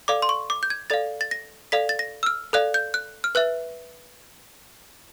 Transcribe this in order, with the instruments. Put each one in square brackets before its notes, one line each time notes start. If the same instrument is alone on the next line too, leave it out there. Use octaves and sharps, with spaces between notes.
[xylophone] A4 D5 F5 D6
C6
C#6
D6
G6
G#6
A4 D5 F5 A6
A6
A#6
A4 D5 F5 B6
A6
A#6
E6
F6
A4 D5 F5 F#6
G6
F#6
F6
B4 E5 F#6